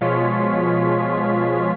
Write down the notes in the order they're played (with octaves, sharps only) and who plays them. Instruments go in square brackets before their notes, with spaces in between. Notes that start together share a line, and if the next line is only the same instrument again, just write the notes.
[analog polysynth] B2 F3 G#3 F4 C#5 B6